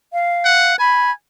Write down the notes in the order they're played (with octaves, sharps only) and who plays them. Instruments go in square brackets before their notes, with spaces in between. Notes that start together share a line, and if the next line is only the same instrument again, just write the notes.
[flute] F5
[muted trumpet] F#5
[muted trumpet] G#5 [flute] B5